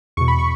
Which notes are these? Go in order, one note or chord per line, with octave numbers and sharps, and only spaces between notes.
E2 B2 C#6
B5
C#6